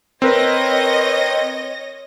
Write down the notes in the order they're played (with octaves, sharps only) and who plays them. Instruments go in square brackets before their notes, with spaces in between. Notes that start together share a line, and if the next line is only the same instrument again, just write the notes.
[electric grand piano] C4 A#4 B4 [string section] C#5 D#5 A#6